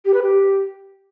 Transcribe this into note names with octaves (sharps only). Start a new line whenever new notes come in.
G4
B4
G4